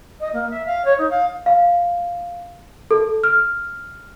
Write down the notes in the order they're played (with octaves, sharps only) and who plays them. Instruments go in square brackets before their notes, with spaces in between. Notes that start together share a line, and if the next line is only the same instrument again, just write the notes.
[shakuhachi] D#5
A#3
E5
F5
C#5
D#4
F5
[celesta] F5
A4
F6